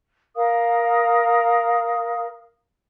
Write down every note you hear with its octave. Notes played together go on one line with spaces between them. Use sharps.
A#4 F5 D#6